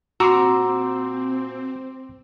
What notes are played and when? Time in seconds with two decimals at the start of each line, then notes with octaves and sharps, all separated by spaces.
0.20 A#2 C4 F#4 A#5 C6 D6 E6